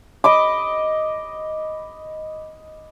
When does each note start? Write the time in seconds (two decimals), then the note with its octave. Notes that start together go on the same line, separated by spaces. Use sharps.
0.24 D#5 B5 D6